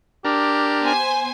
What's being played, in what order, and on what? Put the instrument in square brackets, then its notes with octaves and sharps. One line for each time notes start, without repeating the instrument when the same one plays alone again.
[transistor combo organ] D4 A#4 [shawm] G4
[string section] B3 C5 G#5